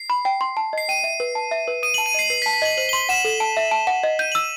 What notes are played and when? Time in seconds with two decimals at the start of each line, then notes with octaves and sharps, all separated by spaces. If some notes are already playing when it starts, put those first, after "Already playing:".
Already playing: C7
0.10 B5
0.25 G5
0.41 C6
0.57 A5
0.73 D#5 C7
0.89 G5 D#7
1.04 E5
1.20 B4
1.35 A5
1.51 E5
1.68 B4
1.83 D#6 D#7
1.94 A5 F#7
2.06 D#7
2.14 D#5 C7
2.30 B4 C7
2.42 B6
2.46 A5
2.54 B6
2.62 D#5 F#7
2.77 C5 F#7
2.89 G7
2.93 C6 F#7
3.09 F#5 E7
3.24 A4
3.40 A5
3.57 E5
3.71 A5
3.87 F#5
4.03 D#5
4.19 G6 D#7
4.32 F#7
4.35 E6